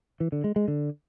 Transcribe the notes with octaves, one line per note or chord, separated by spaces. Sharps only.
E3
D3
G#3
G#3
D3